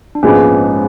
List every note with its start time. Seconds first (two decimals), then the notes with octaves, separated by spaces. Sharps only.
0.15 D4
0.23 A#1 G#2 F3 G#3 B3 C#4